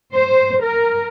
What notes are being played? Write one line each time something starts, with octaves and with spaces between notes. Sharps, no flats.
C5
A#4